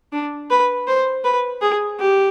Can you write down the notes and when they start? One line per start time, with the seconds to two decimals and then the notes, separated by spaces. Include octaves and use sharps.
0.12 D4
0.50 B4
0.87 C5
1.24 B4
1.62 G#4
2.00 G4